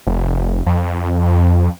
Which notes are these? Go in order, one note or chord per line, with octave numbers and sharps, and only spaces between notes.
F1
F2